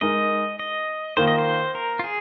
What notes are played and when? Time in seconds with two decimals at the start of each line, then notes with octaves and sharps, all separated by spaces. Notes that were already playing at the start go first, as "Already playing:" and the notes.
0.01 G#3 D#4 A#4 D#5
0.59 D#5
1.17 D#3 A#3 F4 C5
1.28 D#5
1.38 C5
1.75 A#4
1.99 F4
2.04 G#4